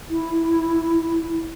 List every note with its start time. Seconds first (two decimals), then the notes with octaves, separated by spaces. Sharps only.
0.10 E4